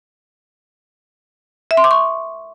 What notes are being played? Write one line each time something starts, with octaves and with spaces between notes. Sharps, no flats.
E5
C6
D6
C#6